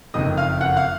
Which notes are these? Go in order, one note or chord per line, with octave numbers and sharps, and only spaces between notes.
F#1 F2 D#3 D#5 D#6
F5 F6
F#5 F#6
F5 F6